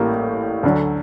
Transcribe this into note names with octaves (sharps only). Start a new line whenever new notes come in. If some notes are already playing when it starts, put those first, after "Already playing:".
Already playing: A1 A2 G3 A#3
D2 D3 F#3